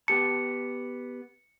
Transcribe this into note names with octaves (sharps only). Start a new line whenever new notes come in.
B3 G4 A5 C#7